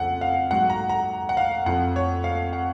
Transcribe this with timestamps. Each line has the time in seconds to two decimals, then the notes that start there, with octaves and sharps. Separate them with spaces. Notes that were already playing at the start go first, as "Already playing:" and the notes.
Already playing: F2 C#3 F3 F#5
0.21 F5
0.51 G#2 F#3 F#5
0.70 A#5
0.89 A#5
1.29 F#5
1.37 F5
1.66 F2 F3 F#5
1.96 C#5
2.24 F5
2.53 F#5